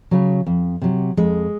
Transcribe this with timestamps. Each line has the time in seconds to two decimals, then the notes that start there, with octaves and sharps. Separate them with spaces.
0.11 C#3 F#3
0.47 F2
0.82 C3 F#3
1.17 F2 G#3